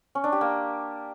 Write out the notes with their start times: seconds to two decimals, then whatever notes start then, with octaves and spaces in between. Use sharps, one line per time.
0.15 C#4
0.24 D4
0.32 G4
0.41 A#3